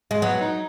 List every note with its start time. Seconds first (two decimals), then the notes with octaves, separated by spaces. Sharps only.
0.11 G#3
0.22 F#3 B3
0.41 D#4